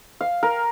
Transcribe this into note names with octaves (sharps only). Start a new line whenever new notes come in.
F5
A#4